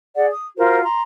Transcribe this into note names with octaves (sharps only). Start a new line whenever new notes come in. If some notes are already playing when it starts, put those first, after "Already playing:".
G#4 D5 F#5
D#6
F4 F#4 A#4 C5
A#5 C6